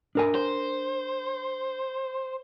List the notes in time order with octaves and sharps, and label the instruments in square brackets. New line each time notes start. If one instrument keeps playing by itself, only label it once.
[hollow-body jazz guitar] D4 A#4 G#5
[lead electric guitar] C5